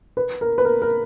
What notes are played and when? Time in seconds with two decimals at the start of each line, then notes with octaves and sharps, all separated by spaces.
0.17 B4
0.41 A#4
0.58 B4
0.65 A#4
0.82 A#4